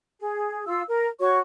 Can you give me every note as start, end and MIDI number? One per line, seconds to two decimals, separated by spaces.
0.20 0.65 68
0.67 0.82 65
0.67 0.82 77
0.67 0.82 88
0.88 1.08 70
1.20 1.38 66
1.20 1.38 73
1.20 1.38 85